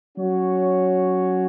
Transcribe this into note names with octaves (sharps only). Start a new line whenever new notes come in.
F#3 C#4 F#4 C#5